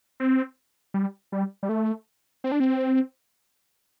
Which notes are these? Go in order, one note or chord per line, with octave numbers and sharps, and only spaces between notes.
C4
G3
G3
G3
A3
C4
D4
C4